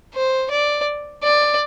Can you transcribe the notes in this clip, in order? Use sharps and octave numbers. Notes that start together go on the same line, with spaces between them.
C5
D5
D5